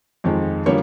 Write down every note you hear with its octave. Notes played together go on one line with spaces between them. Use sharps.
F2 D#3 F3 G#3
D3 F3 G3 A#3 C#5